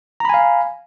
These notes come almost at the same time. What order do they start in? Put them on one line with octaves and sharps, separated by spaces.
A#5 B5 G#5 F5